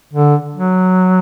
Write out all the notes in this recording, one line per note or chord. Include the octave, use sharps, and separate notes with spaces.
D3
F#3